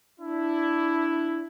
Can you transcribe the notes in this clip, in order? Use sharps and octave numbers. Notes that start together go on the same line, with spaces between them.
D4 E4